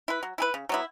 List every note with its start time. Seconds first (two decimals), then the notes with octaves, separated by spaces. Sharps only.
0.08 E4 B4
0.23 F#3
0.38 E4 G#4 B4
0.54 C#3
0.69 F#3 B3 E4